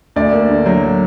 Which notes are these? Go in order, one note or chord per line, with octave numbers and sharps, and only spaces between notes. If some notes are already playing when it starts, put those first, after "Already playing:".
D2 D5
A#3
D3
F#3